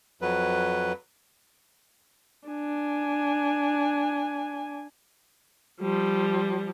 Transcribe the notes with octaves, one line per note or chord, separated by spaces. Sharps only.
F2 F#3 B4
D4 G#5
F3 G3